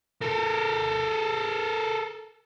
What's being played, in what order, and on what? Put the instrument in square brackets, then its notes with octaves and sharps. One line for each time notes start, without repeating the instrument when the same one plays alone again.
[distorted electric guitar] A4 A#4